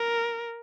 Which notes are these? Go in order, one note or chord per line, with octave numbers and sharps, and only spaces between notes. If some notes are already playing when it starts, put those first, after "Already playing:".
Already playing: A#4